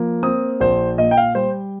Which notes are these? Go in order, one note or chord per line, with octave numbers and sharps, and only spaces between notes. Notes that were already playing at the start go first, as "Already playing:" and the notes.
Already playing: F3 A#3
C4 D#6
A#1 C5
A#2 D#5
G5
F5
G3 C5